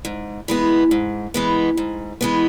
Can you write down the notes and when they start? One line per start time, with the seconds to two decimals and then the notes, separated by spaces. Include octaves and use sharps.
0.05 G#2
0.48 E3 G#3 B3
0.91 G#2
1.34 E3 G#3 B3
1.77 G#2
2.21 E3 G#3 B3